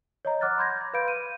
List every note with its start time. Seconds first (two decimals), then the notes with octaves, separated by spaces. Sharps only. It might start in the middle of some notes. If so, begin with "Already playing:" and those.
0.25 C#5 D#5 A#5
0.41 F#5 D6 F6 F#6 A6
0.57 B5 C6 G6 G#6 A#6
0.81 C6
0.94 B4 F5 B5 G6 D7
1.08 D#7